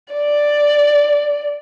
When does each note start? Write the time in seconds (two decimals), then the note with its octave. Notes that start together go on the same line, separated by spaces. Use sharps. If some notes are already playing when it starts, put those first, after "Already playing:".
0.14 D5